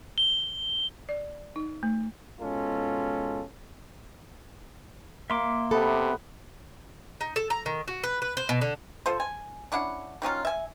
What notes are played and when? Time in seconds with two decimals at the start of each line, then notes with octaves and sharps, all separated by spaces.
0.18 G7
1.09 D5
1.56 D#4
1.83 A3
2.40 G#2 B2 G#3 C#4 F4 A4
5.30 A#3 E5 C6 D6
5.71 C3 B3 A4
7.21 D#4
7.36 A4
7.50 A#5
7.66 D#3
7.88 F#4
8.04 B4
8.22 B4
8.37 C5
8.49 B2
8.61 D3
9.06 F4 A4 C5
9.20 G#5
9.72 C#4 D4 E4 F#5
10.22 D#3 F#3 C#4 F4
10.45 E5 G#5